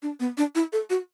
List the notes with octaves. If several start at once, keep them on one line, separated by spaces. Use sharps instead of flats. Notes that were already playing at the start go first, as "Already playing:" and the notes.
D4
B3
D4
E4
A4
F#4